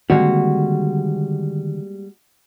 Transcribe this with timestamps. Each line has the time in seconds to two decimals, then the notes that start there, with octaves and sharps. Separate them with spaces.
0.10 D3 D#3 G3 G#3 A#3 C4 F#4